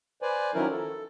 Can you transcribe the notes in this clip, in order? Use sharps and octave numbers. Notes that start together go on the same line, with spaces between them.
B4 C5 D5 G#5
D#3 F3 F#3 C#4 E4 A#4
A4